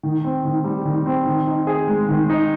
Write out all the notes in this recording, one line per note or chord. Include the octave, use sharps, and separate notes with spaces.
D#3
C4
D#3
G3
D#3
C4
D#3
D#4
G#4
G#3
D#3
D#4